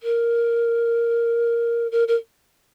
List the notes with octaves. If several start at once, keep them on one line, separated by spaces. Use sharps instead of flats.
A#4
A#4
A#4